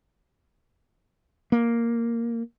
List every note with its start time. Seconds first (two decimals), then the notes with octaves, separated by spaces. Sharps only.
1.52 A#3